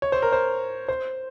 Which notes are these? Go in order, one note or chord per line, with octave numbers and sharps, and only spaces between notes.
C#5
C5
A#4
C5
C5